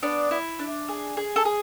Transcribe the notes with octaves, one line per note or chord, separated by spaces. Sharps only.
B3 D4 D5
E4
D4
G#4
G#4
A4
G#4